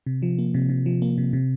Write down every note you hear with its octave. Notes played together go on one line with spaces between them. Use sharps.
C3
F3
A#3
C3
C3
F3
A#3
C3
C3